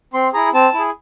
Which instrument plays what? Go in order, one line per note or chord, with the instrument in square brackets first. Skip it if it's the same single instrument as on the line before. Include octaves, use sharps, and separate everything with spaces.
[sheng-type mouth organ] C4 C6
E4 G#4 A#5
C4 A5
E4 G#4